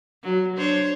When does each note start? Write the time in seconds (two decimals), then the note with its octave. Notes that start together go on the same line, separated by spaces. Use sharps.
0.23 F#3
0.57 D4 C5 C#5